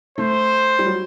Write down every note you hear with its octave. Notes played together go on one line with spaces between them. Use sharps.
A3 C5
G3
F#3